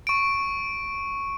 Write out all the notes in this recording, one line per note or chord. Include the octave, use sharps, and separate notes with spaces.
C#6 D7